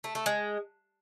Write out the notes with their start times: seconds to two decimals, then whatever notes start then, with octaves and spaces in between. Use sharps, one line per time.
0.04 A3
0.15 A3
0.26 G#3